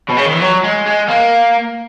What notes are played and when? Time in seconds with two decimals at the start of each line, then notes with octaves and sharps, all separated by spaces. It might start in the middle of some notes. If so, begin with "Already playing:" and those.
0.09 B2
0.17 C#3
0.25 D#3
0.33 E3
0.41 F#3
0.63 G#3
0.86 G#3
1.08 A#3